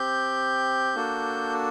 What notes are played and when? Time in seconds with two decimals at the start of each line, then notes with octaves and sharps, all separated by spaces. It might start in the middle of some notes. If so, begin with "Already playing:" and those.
Already playing: C4 G4 G6
0.95 A#3 D4 F#4 A4